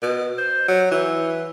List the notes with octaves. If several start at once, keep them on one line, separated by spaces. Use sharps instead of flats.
B2
C5
F#3
E3